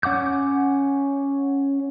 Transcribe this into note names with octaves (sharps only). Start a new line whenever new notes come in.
C#4 F#5 D6 G6